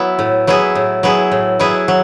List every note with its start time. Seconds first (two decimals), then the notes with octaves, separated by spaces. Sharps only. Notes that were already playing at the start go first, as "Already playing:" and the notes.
Already playing: F#3 B3 E4
0.19 A2
0.47 F#3 B3 E4 G#4
0.75 A2
1.03 F#3 B3 E4 G#4
1.31 A2
1.59 F#3 B3 E4 G#4
1.88 F#3